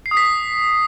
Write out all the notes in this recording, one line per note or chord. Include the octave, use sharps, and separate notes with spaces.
C7
D#6
B6